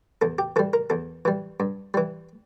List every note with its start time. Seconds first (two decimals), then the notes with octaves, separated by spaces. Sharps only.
0.21 E2 A4
0.38 G4
0.56 E3 G3 A4
0.73 A#4
0.90 E2 A4
1.25 E3 G3
1.60 G2
1.94 E3 G3